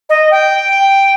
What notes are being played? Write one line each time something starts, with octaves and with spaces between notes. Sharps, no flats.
D#5
G5